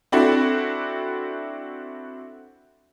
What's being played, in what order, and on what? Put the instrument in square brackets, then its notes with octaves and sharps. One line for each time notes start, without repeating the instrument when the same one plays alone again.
[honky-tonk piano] C4 D4 E4 F#4 A4